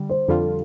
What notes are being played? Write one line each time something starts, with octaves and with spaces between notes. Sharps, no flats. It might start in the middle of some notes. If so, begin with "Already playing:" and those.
Already playing: D3 G3
C5
F2 D3 G3 F4 A4